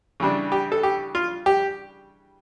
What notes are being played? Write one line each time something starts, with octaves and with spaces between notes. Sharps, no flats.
C#3 E3 G3 D4
G4
A4
G4
F4
G4